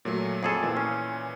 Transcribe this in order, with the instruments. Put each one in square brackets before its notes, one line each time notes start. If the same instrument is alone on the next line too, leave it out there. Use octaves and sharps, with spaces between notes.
[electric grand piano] A#2 F#3 A3
[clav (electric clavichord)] F2 G#4 A4
[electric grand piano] A#2 E3
[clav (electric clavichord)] C#4